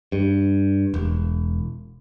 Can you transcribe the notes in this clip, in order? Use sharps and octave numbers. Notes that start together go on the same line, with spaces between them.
G2
E1